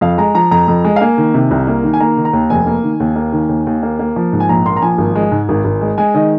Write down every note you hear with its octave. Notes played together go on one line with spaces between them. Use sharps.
F2 F5
G#3 A#5
F3 A#5
F2 A#5
F2
G#3
F5
A#3 G#5
D#3
C3
C2
A#3
D#3
G#5
A#3 A#5
D#3
A#5
D#2
F1 G#5
A#3
D#3
D#2
A#3
D#3
D#2
D#2
A#3
A#3
F3
G#2
G#5
A#1 A#5
A#3 C6
A#5
F3 G#5
G#1
G#3
G#2
G#1
G#1
G#3
G#3 G#5
D#3 D#5